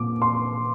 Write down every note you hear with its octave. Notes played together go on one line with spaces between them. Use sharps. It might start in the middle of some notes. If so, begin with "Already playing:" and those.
Already playing: A#2 A#3 D6
C6